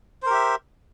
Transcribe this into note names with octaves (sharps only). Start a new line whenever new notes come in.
G4 A#4 C5 E5